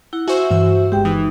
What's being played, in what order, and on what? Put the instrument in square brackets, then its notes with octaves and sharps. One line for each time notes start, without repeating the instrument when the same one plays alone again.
[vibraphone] E4 [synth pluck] F#5
[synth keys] F#4 C5 [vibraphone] E5 [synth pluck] G#5 C#6 E6
[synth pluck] G2 E3 E6
[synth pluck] G1 G#3 [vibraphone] G4 G5
[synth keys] E3 [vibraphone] D#4